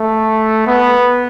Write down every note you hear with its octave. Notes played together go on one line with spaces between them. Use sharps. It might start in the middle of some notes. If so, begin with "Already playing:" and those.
Already playing: A3
B3